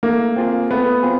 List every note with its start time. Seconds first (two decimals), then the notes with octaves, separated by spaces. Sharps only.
0.03 A3 A#3
0.36 C4 F4 G#4
0.71 A3 B3
1.03 C4 F4 G#4